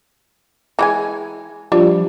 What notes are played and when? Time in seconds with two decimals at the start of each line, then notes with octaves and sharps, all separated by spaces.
0.79 E3 G#3 G#5
1.72 F3 G3 D4